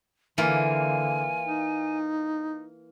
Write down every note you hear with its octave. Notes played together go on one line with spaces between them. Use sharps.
D3 E3 A#3 F4 G#5
D#4